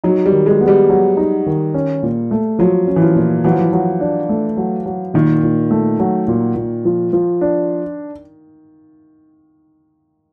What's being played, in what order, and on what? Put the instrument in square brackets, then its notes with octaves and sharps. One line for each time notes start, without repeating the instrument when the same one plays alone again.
[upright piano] F#3 [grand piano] D#4
[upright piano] G3
[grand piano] D#3
[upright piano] G#3
[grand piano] B3
[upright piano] G3
[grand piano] F#3
D#4
D#3
C#4
A#2
A3
[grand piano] F3 [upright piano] F#3
[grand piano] C#4
[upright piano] E3
F3
[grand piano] A#2
[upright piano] E3 [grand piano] F#3
[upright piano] F3
E3
[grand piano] F#3
D4
A3
F#3
F#3
[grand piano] A#2 [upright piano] D#3
[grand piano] A#2
A3
F#3
A#2
A#2
F3
F3
D4